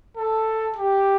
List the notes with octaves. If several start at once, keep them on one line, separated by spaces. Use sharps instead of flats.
A4
G4